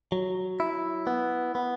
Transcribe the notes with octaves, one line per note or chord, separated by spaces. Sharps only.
F#3
E4
B3
B3